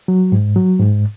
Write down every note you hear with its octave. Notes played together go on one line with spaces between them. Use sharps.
F#3
G#2
F#3
G#2